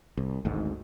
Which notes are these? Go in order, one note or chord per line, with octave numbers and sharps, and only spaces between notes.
C2
G#1 D2 G#2